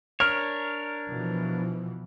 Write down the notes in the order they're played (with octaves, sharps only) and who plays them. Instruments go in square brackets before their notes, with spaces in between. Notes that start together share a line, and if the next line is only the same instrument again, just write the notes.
[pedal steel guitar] D4 A#4 C#5 [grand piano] F6
[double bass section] B2 E3 F3